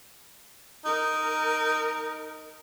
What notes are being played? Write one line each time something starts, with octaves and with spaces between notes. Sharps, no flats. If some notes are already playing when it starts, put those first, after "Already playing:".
D#4 A#4